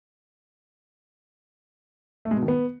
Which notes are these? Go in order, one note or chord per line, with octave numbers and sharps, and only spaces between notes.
A3
G#3
B2
D#3
B3